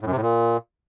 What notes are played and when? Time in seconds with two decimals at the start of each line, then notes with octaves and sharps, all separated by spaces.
0.01 A2
0.06 F#2
0.11 C3
0.17 A2
0.22 A#2